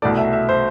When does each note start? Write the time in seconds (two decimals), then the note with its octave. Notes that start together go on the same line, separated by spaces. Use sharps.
0.02 C2 B2 A3 D5
0.17 E5
0.33 E5
0.49 C5